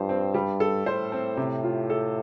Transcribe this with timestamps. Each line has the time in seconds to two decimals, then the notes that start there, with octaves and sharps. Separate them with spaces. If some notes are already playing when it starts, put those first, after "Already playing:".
Already playing: G2 F3 C5
0.09 C4
0.34 G3
0.60 A4
0.86 A2 C5
1.12 C4
1.37 C3
1.64 F4
1.90 A4